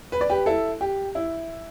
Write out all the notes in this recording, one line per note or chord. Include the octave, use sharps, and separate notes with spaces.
B4
D5
G4 B4
E4 A4
G4
E4